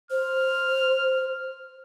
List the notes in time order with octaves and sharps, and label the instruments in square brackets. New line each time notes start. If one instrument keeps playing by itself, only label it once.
[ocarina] C5 [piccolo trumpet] F6